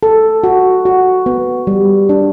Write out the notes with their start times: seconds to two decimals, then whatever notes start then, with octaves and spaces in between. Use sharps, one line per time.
0.03 A4
0.44 F#4
0.85 F#4
1.26 B3
1.67 G3
2.09 D4